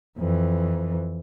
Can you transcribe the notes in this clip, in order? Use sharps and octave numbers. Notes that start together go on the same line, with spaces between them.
F2 E3